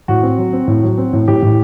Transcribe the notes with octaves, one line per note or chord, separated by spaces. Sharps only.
A2 F#4
C4
F#3
C4
A2
F#3
C4
A2
A2 G4
A2